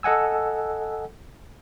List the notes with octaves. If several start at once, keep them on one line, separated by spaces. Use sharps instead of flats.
A4 D#5 F#5 G#5 E6